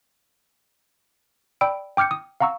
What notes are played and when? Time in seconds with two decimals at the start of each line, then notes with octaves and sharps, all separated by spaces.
1.61 D5 G5 B5 E6 D7
1.97 G5 D6 F6 G6 C#7
2.11 D#6
2.40 F5 F#5 A#5 C#6 E6